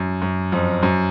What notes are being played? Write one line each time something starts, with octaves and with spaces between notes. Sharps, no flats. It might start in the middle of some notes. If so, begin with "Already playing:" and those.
Already playing: F#2
F#2
F2
F#2